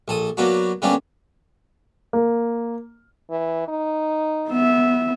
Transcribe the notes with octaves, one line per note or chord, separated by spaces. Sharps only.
A#1 A4 D#6
F#3 A#3 B3 D4 F#4
D3 G3 A#3 B3 C#4 D4
A#3
E3
D#4
B3 E5